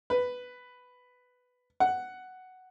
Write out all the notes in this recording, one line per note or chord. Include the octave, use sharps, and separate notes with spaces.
B4
F#5